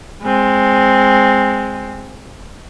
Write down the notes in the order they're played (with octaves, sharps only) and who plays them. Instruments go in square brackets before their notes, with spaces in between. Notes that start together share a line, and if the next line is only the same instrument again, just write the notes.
[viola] G#3 C4